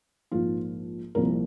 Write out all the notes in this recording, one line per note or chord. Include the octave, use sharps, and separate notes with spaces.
A#1 G#2 F3 A#3 F4
C2 A#2 F3 A#3 A#4